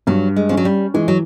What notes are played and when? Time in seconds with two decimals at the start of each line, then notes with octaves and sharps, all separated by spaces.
0.07 G2 F#3
0.36 G#3
0.49 F3 C#4
0.57 F#3
0.65 G3
0.94 E3 G#3
1.08 F#3